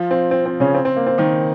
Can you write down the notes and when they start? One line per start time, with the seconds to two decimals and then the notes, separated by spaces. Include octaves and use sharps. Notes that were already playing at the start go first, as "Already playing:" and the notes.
Already playing: F3 F4
0.11 C4
0.31 C4
0.46 C4
0.60 C#3 C#4
0.74 C4
0.85 C4
0.96 A#3
1.07 C4
1.18 D#3 D#4